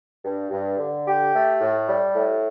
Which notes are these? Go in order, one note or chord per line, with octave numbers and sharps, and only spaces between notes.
G2
G2
D3
G4
A3
A2
G3
A2